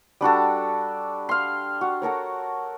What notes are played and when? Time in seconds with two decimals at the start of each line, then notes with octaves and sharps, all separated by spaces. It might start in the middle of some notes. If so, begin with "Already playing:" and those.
0.21 G3 D4 F#4 A4
1.29 F5 C6
1.81 F#4
2.02 F#4 A4 A#4 C#5